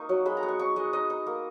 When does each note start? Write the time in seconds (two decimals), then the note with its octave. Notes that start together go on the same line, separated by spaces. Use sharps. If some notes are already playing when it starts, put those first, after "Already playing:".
Already playing: A#3 D#4 C#6
0.09 F#3
0.26 G#3 B5
0.37 A#5
0.43 B3
0.48 C#6
0.59 D#4 C#6
0.76 G#3 D#5
0.93 D#4 D#5
1.10 D#4
1.27 A#3